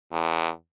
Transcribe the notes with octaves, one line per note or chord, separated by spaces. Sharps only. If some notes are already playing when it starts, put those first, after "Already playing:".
E2